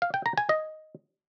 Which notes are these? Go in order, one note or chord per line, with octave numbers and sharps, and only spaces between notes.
F5
G5
A#5
G#5
D#5